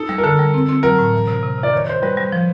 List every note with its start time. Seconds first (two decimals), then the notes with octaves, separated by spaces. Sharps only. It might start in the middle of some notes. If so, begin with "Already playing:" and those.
Already playing: D#4 A4
0.09 G3
0.18 A#4
0.24 D3 A4
0.39 G3
0.54 C4
0.69 C4
0.83 F#3 A#4
0.99 A2
1.13 E3
1.28 C3
1.43 C3
1.58 C3 D5
1.73 D#3 C#5
1.87 D#3 C5
2.02 G3 B4
2.17 G3
2.32 F3